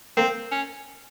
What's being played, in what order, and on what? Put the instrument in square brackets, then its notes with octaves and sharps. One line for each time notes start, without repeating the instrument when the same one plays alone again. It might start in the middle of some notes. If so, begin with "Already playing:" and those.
[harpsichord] A#3 [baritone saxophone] C4
[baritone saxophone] C#4